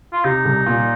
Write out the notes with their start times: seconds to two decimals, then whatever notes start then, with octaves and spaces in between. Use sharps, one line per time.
0.12 F4
0.24 C3 D#4
0.45 C2
0.66 A#2